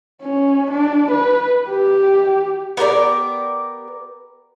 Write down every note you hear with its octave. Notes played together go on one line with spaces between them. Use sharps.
C#4
D4
B4
G4
B3 G4 A#4 D5